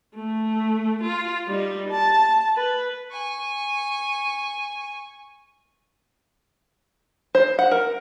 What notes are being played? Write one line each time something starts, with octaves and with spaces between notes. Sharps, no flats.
A3
F4
G3 D#4
A5
B4
G#5 C#6
C5
F#5
A#4